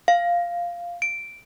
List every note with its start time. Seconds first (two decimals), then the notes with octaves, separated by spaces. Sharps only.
0.08 F5
1.02 D7